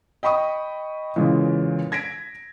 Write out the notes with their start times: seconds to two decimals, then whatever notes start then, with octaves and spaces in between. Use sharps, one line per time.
0.23 D#5 G5 B5 C#6 D#6
1.16 E2 A#2 C#3 G#3
1.92 G#6 A#6 B6 D7